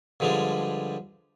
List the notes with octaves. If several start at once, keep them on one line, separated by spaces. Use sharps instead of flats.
G2 D3 F3 G3 G#3 D4